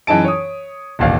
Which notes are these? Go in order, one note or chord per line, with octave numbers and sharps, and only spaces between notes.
F#2 E3 D#4 G#4 A5 D7
C#5 D#6
E1 A1 D#2 F5